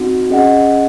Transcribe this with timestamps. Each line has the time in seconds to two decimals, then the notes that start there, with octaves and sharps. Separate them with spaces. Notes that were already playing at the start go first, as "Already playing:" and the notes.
Already playing: C4 D#4 F#4
0.30 C#4 G#4 D#5 F#5